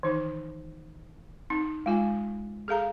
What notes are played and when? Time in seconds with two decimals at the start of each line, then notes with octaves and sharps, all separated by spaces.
0.03 D#3 E3 D#4
1.50 C4 D#4
1.86 G#3 F4 G#5
2.68 G#4 A4 F5 A#5